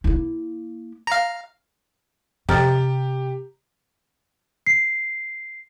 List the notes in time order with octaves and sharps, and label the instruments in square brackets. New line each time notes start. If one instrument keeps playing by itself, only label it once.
[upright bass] A#3 E4
[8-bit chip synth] F5 A#5
[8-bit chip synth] F2 [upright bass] C3 [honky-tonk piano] G4 [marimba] A#5 F6 A6
[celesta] C7